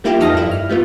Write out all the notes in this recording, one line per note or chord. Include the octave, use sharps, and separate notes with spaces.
G3 A#3 E4 F4 G4
F2 D#4 A4 D#6 F6 A#6
G2 E4
F6
G3 A3 B3 F4